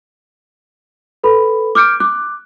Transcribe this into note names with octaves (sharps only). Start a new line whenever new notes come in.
A4 B4 B5
D6 F6 G6 C#7 D7
D6 F#6